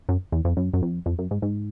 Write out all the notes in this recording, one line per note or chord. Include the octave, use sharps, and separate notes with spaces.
F#2
E2
F2
F#2
F#2
F2
F2
F#2
G#2
G#2